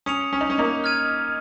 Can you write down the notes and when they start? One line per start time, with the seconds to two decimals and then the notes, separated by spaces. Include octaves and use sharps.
0.06 C#4 D#6 C#7 F7
0.33 C#4
0.41 D#4
0.50 C#4
0.58 A#3 D#4
0.84 F6 G#6 D#7